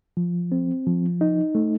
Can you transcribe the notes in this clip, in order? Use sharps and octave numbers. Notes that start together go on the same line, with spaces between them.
F3
C4
F3
D#4
A3